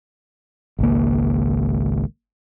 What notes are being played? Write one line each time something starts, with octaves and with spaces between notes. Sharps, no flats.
G#1 C#2 A#3